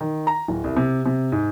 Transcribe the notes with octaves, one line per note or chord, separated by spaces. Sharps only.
D#3
A#5
D1
C2
C3
C3
G#2